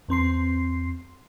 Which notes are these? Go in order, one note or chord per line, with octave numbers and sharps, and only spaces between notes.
E2 C4 C6 C7